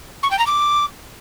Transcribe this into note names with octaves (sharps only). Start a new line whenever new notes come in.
C#6
G5
A#5
D6